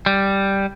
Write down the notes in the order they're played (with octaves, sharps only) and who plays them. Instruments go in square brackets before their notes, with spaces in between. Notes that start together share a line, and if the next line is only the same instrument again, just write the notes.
[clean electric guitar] G3